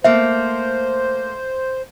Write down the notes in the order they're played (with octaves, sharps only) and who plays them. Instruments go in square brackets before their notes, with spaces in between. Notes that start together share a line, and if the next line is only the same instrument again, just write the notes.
[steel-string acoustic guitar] A3 A#3 [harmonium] C5 [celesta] E5